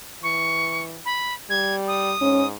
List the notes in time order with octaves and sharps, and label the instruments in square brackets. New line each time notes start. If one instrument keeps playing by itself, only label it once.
[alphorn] E3 [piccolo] C#6
[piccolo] B5
[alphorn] G3 [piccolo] G#6
[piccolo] D#6
[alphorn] G#2 [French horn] C#4